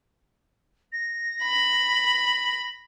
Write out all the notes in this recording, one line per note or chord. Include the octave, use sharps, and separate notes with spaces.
A#6
B5